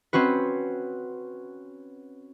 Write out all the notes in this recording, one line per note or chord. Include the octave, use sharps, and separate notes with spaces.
C4 C#4 F#4 B4